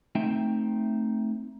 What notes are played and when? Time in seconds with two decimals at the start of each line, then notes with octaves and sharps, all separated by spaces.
0.15 A3 C4 D#4 E5 G5